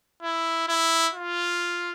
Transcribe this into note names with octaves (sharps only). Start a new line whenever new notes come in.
E4
E4
F4